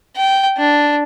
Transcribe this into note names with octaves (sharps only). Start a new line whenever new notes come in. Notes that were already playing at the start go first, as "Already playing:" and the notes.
G5
D4